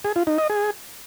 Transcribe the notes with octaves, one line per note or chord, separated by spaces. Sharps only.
G#4
F4
D#4
D#5
G#4